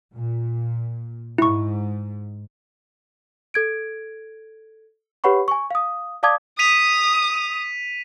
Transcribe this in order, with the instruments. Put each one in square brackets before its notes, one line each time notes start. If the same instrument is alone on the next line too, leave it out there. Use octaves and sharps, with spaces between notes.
[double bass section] A#2
[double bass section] G#2 [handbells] E4 C#6
[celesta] A4 G#6 D7
G4 B4 C#5 F#5 B5 C#6
G#5 C#6
F5 D#6
D5 F5 A5 D6 D#6 G#6
[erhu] D#6 [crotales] B6 D#7 F7